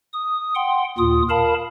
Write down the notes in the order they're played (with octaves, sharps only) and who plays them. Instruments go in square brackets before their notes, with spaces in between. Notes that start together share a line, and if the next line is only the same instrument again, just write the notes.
[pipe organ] D#6
F#5 G5 C6
D#2 A#2 F4 D#6
A#4 F5 A5 B5